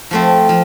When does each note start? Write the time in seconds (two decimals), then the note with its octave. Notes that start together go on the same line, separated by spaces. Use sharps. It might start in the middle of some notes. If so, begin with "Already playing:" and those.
0.11 F3 A3 C4
0.49 F3